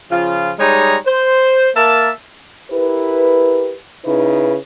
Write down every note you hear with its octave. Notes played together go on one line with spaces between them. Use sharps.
C#3 F3 F4
G3 G#3 D#4 C#5 A#5
C5
A#3 A#4 E5 A5
E4 G4 A#4 B4
C#3 D#4 E4 B4